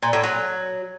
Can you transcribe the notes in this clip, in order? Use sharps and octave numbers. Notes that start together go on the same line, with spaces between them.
A#2
A2
F#3